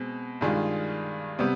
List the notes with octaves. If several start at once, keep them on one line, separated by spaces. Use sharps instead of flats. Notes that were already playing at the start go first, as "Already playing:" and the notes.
Already playing: B2 G#3 C4
G2 D#3 G#3 D4 F4
C3 G3 B3